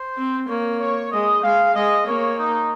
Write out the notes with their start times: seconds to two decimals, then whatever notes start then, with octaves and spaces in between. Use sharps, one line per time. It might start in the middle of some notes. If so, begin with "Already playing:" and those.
Already playing: C5
0.17 C4
0.48 A#3 C#5
0.80 C#5
1.12 G#3 D#5
1.43 G#3 F5
1.75 G#3 D#5
2.06 A#3 C#5
2.38 D#4